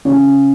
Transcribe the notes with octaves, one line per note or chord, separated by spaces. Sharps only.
C#3 C#4